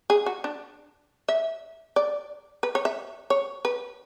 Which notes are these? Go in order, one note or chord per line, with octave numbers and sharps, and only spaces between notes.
G#4
F#4
D4
E5
D5
B4
C#5
E5
C#5
B4